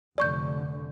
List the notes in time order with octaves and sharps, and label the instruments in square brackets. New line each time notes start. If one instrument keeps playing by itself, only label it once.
[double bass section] F1 D3 [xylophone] D5 C#6 G6